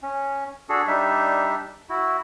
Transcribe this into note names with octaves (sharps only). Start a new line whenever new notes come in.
C#4
D4 F#4 G#4 A4
G3 D4 D#4 E5
E4 F#4